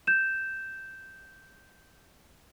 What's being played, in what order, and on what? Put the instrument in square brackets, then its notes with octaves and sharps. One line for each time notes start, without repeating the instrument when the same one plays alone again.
[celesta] G6 E7